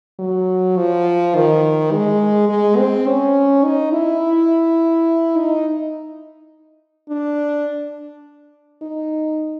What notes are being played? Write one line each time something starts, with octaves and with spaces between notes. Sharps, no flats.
F#3
F3
D#3
G#3
G#3
C4
C#4
D#4
E4
D#4
D4
D#4